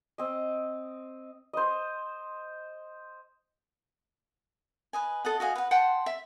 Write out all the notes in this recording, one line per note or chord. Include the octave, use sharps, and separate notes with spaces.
C4 D#5
C5 D#5
B4 D#5 G#5
A4 D#5 F#5
F#4 D#5 F5 G#5
B4 F#5
F#5 G5 A5 C6
E5